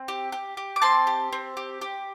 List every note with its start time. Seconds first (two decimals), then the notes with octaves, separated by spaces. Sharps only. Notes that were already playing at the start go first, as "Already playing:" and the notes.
Already playing: C4
0.08 G4
0.32 G4
0.57 G4
0.76 D6
0.82 C4 A5 C6
1.07 G4
1.33 C4
1.57 G4
1.81 G4